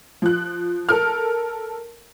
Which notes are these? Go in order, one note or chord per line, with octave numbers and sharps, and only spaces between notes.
F3 F#6
A4 A#4 F6